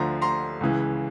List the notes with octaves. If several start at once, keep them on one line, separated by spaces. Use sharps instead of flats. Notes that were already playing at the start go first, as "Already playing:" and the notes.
Already playing: D2 D3 F3 A#5 C6
A#5 C6
C#2 C#3 E3